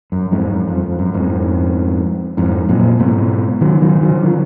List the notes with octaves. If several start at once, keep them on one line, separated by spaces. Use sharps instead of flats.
F#2
F2 G#2
F#2
F2
F2
F#2
F2 G#2
F2 G#2
F#2 A#2
G#2 B2
D#3 F#3
D#3 F#3
D#3 F#3
D3 F3